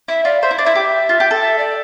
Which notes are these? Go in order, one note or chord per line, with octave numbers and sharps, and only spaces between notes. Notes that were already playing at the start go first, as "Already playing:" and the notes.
E4 E5
F4 D5
C5 E5
E4
D4
E4 E5
G4
F4
G4
A4
E5
D5